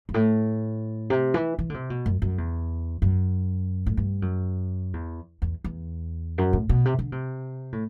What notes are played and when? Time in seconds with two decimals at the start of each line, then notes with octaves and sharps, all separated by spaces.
0.09 G2
0.14 A2
1.10 C3
1.34 E3
1.59 E3
1.70 D3
1.74 C3
1.90 B2
2.06 F#2
2.22 F#2
2.38 E2
3.02 F#2
3.86 A2
3.97 G2
4.22 F#2
4.93 E2
5.42 E2
5.64 E2
6.38 F#2
6.53 A2
6.69 B2
6.85 C3
6.99 D3
7.12 C3
7.73 A2